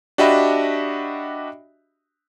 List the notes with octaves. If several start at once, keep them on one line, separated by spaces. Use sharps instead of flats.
D4 F#4 G4 D#5 E5 B5